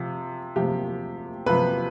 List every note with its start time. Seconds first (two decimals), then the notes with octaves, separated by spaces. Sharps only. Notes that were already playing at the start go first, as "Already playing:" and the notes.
Already playing: C3 F3
0.56 C3 F3 G4
1.46 C3 F3 B4